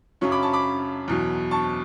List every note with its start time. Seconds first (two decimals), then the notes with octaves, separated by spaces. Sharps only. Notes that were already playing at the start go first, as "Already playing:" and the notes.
0.21 F#2 C#3 F#3 C#4 C#6
0.32 B5 D6
0.42 A5 C#6
0.53 B5 D6
1.08 E2 B2 F#3
1.51 A5 C#6